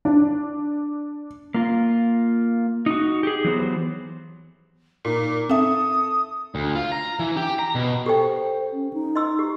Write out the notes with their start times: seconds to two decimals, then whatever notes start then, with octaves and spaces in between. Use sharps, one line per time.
0.05 D4
1.54 A#3 F4
2.86 D#4 F#4
3.23 G4 G#4
3.44 E3 F#3 B3 C5
5.05 A#2 D#4
5.49 C4 A4 E5 D#6
6.55 D2
6.75 F4
6.92 A#5
7.19 E3
7.37 G4
7.59 A#5
7.75 B2
8.06 G4 A4 C5 G5
8.72 C#4
8.93 D#4
9.16 D#5 C6 E6
9.39 G4